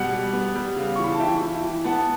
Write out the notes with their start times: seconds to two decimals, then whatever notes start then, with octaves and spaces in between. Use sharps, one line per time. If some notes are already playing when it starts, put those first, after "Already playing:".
Already playing: B2 G3 F#5
0.13 G3
0.33 B3
0.55 G3
0.76 C#3
0.96 C#6
0.99 E3 B5
1.12 A5
1.20 E3 E5 G5
1.41 E3
1.64 E3
1.84 B3 F#5 A5